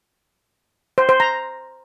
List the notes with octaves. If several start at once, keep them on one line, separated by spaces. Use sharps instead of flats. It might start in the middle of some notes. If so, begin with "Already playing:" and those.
C5
C5
A#5